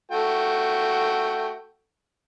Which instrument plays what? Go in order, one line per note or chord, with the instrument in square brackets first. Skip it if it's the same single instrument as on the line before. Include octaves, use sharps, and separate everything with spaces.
[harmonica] A3 F#4 G5